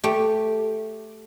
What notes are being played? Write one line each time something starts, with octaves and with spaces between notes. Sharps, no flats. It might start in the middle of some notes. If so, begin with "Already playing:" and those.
A3 G4